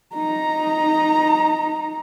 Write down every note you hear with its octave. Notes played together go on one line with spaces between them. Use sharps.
D#4 A#5